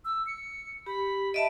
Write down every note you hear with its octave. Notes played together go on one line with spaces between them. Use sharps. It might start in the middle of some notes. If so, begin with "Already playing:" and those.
E6
C#7
G4 B5
D#5 E5 A5 D7